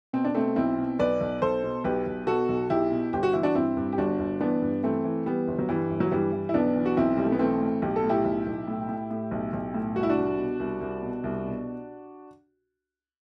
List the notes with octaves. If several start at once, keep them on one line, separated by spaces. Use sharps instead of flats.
B2 C4
D4
B2 A3 C4
B1 C4 E4
B2
B1 B4 D5
B1
B1 A4 C5
B2
B1 G4 B4
B1
B2 F#4 A4
B1
B1 E4 G4
B2
G1 G4
F#4
E3 E4
D4 F#4
G2 C4 E4
G2
G4
G1 D4 F#4
G1
E3 B3 D4
G2
E3 A3 C4
E3
E3 G3 B3
G1
F#3
G2 E3 G3
G1
F#3
G2 E3 G3
E3
E4
B1 B3 D4
E3
F#4
B1 C4 E4
B1 G3
A3
B3
E3 A3 C4
A2
B1 G4
A4
A2
E4 G4
B1
B1
A2
A2
A2
B1
B1
A2
C2 F#4
E4
D4 F#4
C2
B2
C2
C2
B2
C2
B2